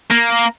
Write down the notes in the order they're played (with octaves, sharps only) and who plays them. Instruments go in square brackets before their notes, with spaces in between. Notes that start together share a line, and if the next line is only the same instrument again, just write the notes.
[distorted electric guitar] A#3